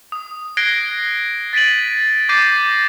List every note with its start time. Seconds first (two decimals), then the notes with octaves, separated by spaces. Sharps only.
0.12 D#6
0.57 F#6 G#6 A#6 C7 D7 G7
1.53 A6 B6 D7 D#7 F#7
2.29 D6 G6 A6 A#6 C7 D#7